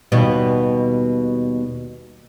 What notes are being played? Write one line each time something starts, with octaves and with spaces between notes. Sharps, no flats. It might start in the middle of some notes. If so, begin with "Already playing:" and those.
D#2 B2 G3